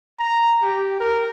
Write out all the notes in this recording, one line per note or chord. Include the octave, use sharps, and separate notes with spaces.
A#5
G4
A#4